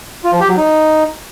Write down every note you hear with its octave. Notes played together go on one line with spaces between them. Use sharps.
F4
F3
G4
F#3
D#4